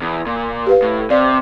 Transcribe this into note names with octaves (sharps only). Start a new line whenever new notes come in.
E2
A#2
G4 B4 F5
A2
C3 D5 F5